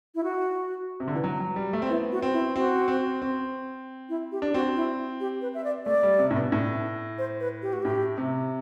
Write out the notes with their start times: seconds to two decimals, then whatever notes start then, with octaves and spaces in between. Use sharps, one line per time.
0.15 E4
0.24 F#4
1.00 C3
1.08 D3
1.15 E3
1.24 F#3
1.40 F#3
1.56 G3
1.73 A3
1.82 C4
1.89 B3 E4
2.12 F#4
2.22 C4
2.33 E4
2.56 C4 F#4
2.88 C4
3.22 C4
4.09 E4
4.32 G4
4.42 D4
4.54 C4 F#4
4.76 E4
5.20 G4
5.41 B4
5.55 E5
5.64 D5
5.86 A3 D5
6.03 G3
6.19 C3
6.31 A2
6.36 B2
6.52 A2
7.18 C5
7.40 B4
7.62 G4
7.73 F#4
7.82 A2 G4
8.18 C3